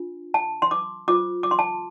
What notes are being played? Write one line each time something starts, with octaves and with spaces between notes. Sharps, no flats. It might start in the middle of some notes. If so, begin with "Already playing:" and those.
Already playing: D4 F4
A5
C6
D6
F4 C5 D6
D6
C6
A5